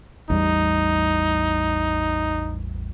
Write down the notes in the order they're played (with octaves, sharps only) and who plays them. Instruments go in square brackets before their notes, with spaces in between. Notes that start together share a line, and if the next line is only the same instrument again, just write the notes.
[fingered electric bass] A1 E2 G3 [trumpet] D#4